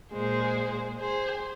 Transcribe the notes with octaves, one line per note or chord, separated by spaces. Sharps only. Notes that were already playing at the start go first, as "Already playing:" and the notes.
A#2 G#3 G#4 C5
G#4 C5